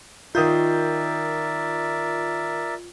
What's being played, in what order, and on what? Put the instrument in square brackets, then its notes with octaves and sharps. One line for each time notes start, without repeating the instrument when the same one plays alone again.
[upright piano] D#3 D#6 G6 [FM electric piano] F4 [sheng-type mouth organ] A#4 D5 E5